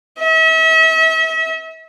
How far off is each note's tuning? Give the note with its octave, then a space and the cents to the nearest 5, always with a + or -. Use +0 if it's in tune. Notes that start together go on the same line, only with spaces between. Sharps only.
E5 -40